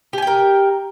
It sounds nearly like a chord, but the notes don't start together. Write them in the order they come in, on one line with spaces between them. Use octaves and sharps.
G4 G#5 G5 A#4